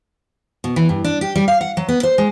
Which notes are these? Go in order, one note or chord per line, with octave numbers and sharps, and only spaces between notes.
B2
E3
G2
D4
G4
G3
F5
F#5
F#3
B3
C5
G#3